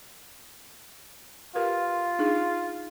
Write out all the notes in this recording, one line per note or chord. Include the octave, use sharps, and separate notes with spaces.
F4 G4 A#4 B4
D4 D#4 G#4